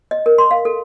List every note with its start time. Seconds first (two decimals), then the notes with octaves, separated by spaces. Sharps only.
0.11 D#5
0.26 A#4
0.38 C6
0.51 F5
0.65 A4